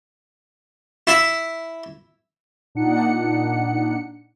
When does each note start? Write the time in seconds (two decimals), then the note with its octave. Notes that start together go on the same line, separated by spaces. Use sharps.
1.07 E4 E5
2.75 A#2 D4 D#4 F#5 C#7